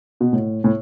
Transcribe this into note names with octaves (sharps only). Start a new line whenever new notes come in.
B2
A2
A2